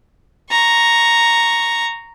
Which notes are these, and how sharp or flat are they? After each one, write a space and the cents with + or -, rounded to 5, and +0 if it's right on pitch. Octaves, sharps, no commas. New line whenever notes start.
A#5 +0 C#6 +0